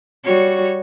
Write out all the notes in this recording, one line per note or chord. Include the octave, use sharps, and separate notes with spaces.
G3 F#4 C#5